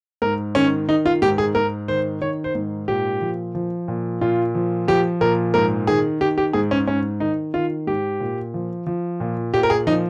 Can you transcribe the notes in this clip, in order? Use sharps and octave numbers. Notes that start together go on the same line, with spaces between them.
G#2 A#4
D#3 C#4
D#3 D#4
F4
G#2 G4
G#4
G#2 A#4
D#3 C5
D#3 C#5
C5
G#2
A#2 G4
F3
F3
A#2
A#2 F4
F3
F3 G4
A#2 A#4
G#2 A#4
D#3 G#4
D#3 G4
G4
G#2 G#4
C#4
G#2 C#4
D#3 D#4
D#3 F4
G#2 G4
A#2
F3
F3
A#2
A#2 G4
A#4
G#4
F3 D#4